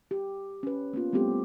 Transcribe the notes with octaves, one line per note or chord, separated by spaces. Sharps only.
G4
C#4 B4
A#3 B3 C#4 F4
G3 A3 B3 C4 G4 A4